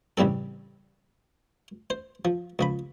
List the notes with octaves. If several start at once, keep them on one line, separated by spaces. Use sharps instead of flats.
A1 C#3 G3 C4 A4
C5
F3
C#2 F3 B5